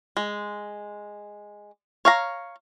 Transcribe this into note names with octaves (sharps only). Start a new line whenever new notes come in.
G#3
C#5 F5 A#5